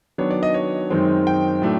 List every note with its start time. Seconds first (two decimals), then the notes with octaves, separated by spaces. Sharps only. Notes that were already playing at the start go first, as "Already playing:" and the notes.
0.18 D#3 F#3 B3 D4 C#5
0.31 D5
0.43 D#5
0.54 C#5
0.90 F#2 D#3 G#3 C4 D#4
1.27 G5
1.62 A2 F#3 A3 D4